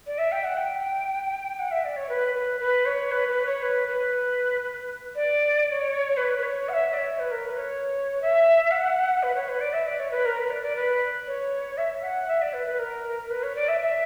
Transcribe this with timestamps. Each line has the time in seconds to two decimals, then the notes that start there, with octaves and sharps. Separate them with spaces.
0.07 D5
0.18 E5
0.32 G5
0.44 F#5
0.57 G5
1.59 F#5
1.71 E5
1.85 D5
1.96 C#5
2.09 B4
2.35 B4
2.60 B4
2.86 C#5
3.12 B4
3.28 B4
3.46 C#5
3.63 B4
3.88 B4
5.15 D5
5.67 D5
5.72 C#5
6.17 B4
6.39 B4
6.43 C#5
6.69 F#5
6.73 E5
6.94 D5
6.98 C#5
7.19 B4
7.31 A#4
7.45 B4
7.57 C#5
8.22 E5
8.71 F#5
9.23 B4
9.35 C#5
9.49 B4
9.61 D5
9.73 E5
9.87 D5
10.00 C#5
10.11 B4
10.25 A#4
10.38 B4
10.51 D5
10.63 D5
10.76 B4
11.27 C#5
11.78 E5
12.02 F#5
12.28 E5
12.42 D5
12.54 B4
12.67 B4
12.79 A#4
13.30 B4
13.43 C#5
13.56 D5
13.68 E5
13.81 E5